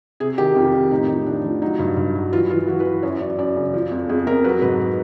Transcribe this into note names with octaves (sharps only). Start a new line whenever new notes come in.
C3 G#4
D#3 G4
F2 F4
D#3
A2 D#4
F3
A2 D4
F3
F#3 D#4
G2
G2
F#3
E3 F4
E3 F4
E3 F#4
B4
E3
F#2 C#5
F#2 D5
F#2 D5
C#3
F3
F2
F2 G#4
F2 A#4
F#3 B4
G#2 B4